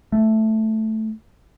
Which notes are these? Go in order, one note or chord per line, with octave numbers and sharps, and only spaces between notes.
A3